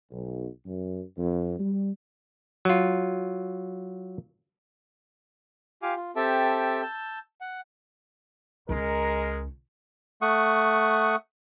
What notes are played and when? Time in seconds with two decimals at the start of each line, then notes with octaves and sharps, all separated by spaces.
0.11 B1
0.66 F#2
1.18 F2
1.60 G3
2.65 F#3 F4
5.82 F4 G4 F5 G#5 D6
5.96 F4
6.16 C4 G4 A4 E5 G5 A5
6.82 A5 E6 G6
7.41 F#5
8.69 C#2 G#3 C#4 A#4
10.22 A3 F#5 C#6 D#6